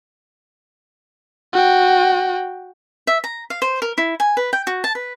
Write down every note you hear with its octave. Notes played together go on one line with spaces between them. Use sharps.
F#4 G5
E5
A#5
F5
C5
A#4
E4
G#5
B4
G5
F#4
A5
B4